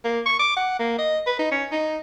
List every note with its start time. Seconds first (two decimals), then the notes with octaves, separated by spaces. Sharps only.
0.04 A#3
0.26 C#6
0.39 D6
0.57 F#5
0.79 A#3
0.99 D#5
1.26 B4
1.39 D#4
1.52 C#4
1.72 D#4